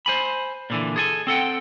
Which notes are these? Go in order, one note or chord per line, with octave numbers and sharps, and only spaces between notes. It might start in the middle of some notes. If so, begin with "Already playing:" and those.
C5 G#5 B5
A#2 D3 E3
G#4 A4 G#5
C4 A4 F#5 G5